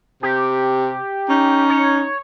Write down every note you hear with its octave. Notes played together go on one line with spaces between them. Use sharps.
C3 G4
C#4 D#4
C#5